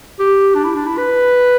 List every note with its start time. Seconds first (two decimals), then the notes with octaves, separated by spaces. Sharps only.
0.19 G4
0.55 D4
0.64 E4
0.75 D4
0.87 E4
0.98 B4